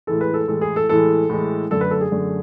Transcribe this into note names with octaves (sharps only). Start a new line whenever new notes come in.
A2 E3 G#3 A4
B4
A4
A2 E3 G#3 A4
G#4
A4
A2 E3 G#3 A4
A2 E3 G#3
F#2 D3 A3 A4
B4
A4
G#4
F#2 D3 A3